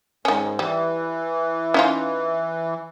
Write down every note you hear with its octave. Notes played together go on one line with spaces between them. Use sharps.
G#2 D#3 C#4
E3 G3
C#4 D#4 F4